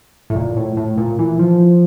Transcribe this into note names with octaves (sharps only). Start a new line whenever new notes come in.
A2
A#2
A2
A2
A#2
E3
F3